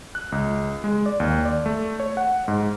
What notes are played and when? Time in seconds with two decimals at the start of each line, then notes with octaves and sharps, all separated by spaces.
0.15 F#6
0.32 C#2
0.84 G#3
1.06 D5
1.20 D#2
1.45 D5
1.66 A3
2.00 C#5
2.17 F#5
2.48 G#2